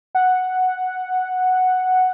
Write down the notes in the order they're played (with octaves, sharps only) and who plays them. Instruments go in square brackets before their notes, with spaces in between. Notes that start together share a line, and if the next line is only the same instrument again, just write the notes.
[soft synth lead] F#5